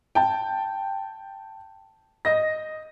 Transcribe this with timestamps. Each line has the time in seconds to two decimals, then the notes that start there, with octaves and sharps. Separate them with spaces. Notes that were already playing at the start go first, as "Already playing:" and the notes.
0.15 G5 A5
2.25 D#5 A#6